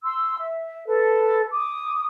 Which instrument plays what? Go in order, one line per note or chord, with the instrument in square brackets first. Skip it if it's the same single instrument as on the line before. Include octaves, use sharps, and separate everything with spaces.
[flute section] C6 E6
E5
A4 B4
D6 D#6